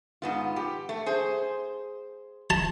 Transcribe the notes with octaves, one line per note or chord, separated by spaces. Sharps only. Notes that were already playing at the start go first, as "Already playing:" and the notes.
G#2 B3 F4
G4
A3
G#4 C5
A5